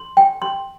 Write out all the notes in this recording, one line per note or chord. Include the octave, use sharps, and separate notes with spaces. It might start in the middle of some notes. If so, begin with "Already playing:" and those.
Already playing: C6
G5
C6